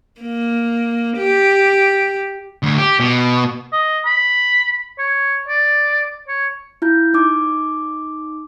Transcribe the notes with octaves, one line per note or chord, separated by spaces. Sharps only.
A#3
G4
D2
G4
B2
D#5
B5
C#5
D5
C#5
E4 F4 G6
D#4 D6 D#6